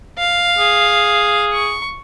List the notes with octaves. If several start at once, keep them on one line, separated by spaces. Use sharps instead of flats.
F5
G#4
C#6